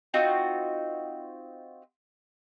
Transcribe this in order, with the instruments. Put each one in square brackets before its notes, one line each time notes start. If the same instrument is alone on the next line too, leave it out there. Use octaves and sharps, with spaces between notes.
[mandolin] C4 D#4 F4 F#4